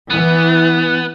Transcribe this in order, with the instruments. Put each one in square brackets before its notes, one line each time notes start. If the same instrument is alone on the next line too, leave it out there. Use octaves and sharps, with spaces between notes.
[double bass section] E3 [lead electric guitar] B3